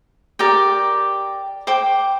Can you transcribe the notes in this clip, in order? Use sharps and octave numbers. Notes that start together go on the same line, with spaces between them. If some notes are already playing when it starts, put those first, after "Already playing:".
G4 A#4 D5 G5
C5 G5 D6